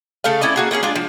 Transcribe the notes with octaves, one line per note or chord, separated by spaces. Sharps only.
C#3 A3 A4 F5
C#4 E4 D5 D#5
A#3 F#4 G#4
A3 A#3 C#4 G#4
G#3 D4 F4
F3